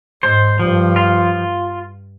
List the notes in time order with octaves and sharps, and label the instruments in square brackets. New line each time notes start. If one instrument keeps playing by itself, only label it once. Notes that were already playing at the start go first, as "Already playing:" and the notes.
[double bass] G#2 [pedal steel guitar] C5
[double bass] G2 [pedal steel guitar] F3
[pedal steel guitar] F4